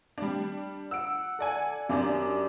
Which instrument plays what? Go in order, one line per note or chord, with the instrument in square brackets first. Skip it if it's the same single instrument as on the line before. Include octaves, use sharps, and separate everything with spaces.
[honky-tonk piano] G3 D4
[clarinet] F#5 [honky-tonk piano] E6 D7
[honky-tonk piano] A4 D5 G#5
[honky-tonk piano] F#2 D4 D5 [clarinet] G4